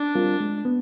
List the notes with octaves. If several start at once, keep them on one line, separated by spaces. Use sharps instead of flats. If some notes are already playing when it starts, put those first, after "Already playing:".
Already playing: D4
G3 C4 F4 A#4
G#3
B3